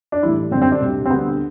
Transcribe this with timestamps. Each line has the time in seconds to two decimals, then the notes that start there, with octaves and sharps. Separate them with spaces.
0.12 D4
0.23 A2 E3 G3 E4
0.51 F#2 D3 G3 C4
0.62 C4
0.72 D4
0.81 D2 C3 G3
1.06 C4
1.10 D2 D3 G3 B3